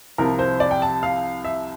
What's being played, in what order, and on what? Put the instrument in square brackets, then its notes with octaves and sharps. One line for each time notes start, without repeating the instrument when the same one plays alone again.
[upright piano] C2 C3 F3 A#4
C5
D5
G5
A5
F5
E5